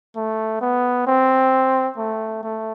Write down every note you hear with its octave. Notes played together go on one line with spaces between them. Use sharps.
A3
B3
C4
A3
A3